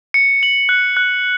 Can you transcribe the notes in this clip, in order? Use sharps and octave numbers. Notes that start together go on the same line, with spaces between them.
C#7
F#7
F#6
F#6